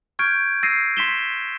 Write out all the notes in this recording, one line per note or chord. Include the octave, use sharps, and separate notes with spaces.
C#6 F6 G6 G#6 D7
E6 A6 A#6 C7 D#7
C6 B6 E7 G7